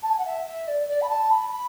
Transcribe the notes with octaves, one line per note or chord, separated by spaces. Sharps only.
A5
G#5
F#5
E5
E5
D5
D5
B5
A5
B5
B5